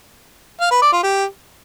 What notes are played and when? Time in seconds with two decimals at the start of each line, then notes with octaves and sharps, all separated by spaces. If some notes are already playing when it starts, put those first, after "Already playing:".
0.61 F5
0.71 B4
0.82 D5
0.93 F4
1.03 G4